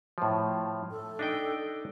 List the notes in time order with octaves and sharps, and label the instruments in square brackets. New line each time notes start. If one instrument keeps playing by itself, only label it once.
[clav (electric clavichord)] A2 F3
[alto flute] A4
[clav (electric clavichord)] D4 D#4 G5